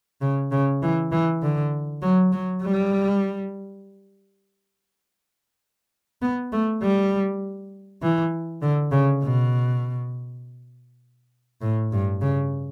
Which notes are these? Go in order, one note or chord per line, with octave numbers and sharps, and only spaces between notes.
C#3
C#3
E3
E3
D3
F#3
F#3
G3
B3
A3
G3
E3
D3
C#3
B2
A2
G2
C#3